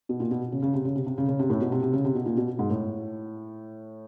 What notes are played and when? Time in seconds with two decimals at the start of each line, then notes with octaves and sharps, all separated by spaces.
0.09 B2
0.20 A#2
0.31 B2
0.52 C#3
0.63 C#3
0.74 C3
0.85 C#3
0.96 C3
1.07 C3
1.18 C#3
1.28 C#3
1.39 C3
1.50 A2
1.61 B2
1.72 C3
1.83 C3
1.93 C#3
2.05 C3
2.15 B2
2.26 A#2
2.37 B2
2.59 G#2
2.70 A2